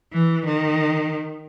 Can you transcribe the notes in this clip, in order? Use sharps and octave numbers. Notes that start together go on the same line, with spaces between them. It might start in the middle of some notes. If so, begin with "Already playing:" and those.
E3
D#3